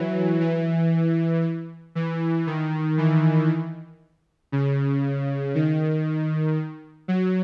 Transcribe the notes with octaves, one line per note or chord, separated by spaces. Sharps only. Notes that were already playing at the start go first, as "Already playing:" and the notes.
Already playing: E3 F#3
E3
E3
D#3
E3
C#3
D#3
F#3